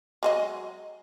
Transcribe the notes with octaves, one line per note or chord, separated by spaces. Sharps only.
F#3 G#3 D#5